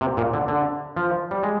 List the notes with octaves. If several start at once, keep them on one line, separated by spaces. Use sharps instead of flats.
C3
A#2
D3
D3
F3
G3
G#3